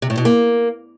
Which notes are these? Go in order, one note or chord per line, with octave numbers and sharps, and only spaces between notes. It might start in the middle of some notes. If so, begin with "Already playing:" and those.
C3
A2
B2
A#3